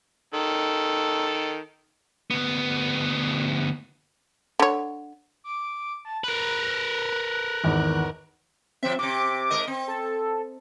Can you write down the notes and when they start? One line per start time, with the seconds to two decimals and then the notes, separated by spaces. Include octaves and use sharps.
0.34 D#3 A4
2.31 D2 B3
4.59 D3 C#5
5.44 D6
6.05 A5
6.24 A#4 B4 F#6
7.64 G#1 E2
8.83 F3 C4 E5
8.99 C3 C4 D6
9.50 G#2 A#4 D#5
9.67 C4
9.88 A4